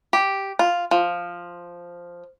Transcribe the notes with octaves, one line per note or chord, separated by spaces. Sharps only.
G4
F4
F3